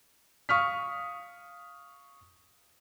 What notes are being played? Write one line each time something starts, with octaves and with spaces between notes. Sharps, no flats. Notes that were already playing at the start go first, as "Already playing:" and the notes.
F5 C#6 D#6 F6 B6